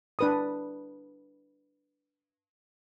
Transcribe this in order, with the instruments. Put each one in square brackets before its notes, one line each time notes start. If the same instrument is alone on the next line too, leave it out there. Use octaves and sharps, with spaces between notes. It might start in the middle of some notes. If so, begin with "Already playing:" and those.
[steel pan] D4 B4 D#6